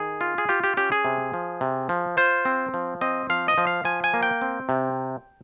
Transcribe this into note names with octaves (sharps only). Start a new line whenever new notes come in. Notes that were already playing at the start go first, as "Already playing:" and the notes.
Already playing: D#3 G#4
F4
G#4
F4 G4
G4
C#4 G4
G#4
C3
F3
C3
F3
F4 C5
C4
F3
C4 D#5
F3 F5
D#5
F3
F5
F3 G#5
G#5
A#3
G5
C4
C3